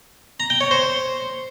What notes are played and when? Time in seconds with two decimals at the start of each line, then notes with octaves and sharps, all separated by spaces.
0.40 A#5
0.50 G5
0.61 C#5
0.71 C5